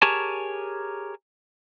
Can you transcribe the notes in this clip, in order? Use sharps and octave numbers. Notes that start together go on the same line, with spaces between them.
G4 G#4 A#4 C#5 G#5 A5